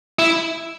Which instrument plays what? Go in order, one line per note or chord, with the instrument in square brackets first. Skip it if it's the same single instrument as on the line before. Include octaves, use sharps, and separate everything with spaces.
[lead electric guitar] E4